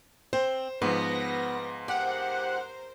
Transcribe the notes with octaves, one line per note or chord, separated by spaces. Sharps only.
C4 C5
G#2 F3 B3 B4 A#6
G4 A#4 C5 F#5